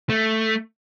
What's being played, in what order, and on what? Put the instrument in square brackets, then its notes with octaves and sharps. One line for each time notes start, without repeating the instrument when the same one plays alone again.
[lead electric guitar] A3